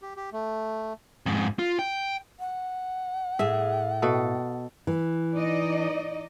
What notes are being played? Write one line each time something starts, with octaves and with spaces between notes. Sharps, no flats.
G4
G4
A3
F2 G#2
F4
G5
F#5
A2 G#4 E5
B2 A4
E3
D#4 D5 D#5